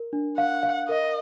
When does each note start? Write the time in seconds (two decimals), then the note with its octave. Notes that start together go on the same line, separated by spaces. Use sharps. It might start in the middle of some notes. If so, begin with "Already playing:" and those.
Already playing: A#4
0.13 D4
0.38 F5 F#5
0.63 F5
0.89 A#4 D#5